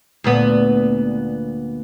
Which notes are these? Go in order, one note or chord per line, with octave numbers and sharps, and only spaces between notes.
D2 A#2 B3